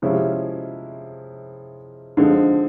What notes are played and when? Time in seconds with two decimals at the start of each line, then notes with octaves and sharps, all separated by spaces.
0.02 C3 F3 G#3 C#4 E4
2.17 D3 F3 G#3 C4 D#4